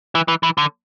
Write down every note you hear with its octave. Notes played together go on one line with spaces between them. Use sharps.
E3
E3
E3
D3